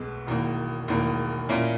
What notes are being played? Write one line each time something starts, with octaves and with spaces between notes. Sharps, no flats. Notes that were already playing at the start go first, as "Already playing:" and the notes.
Already playing: B1 B2 G#3 B3
E1 E2 D#3 A#3
E1 E2 D#3 A#3
A#2 A#3 C#4 E4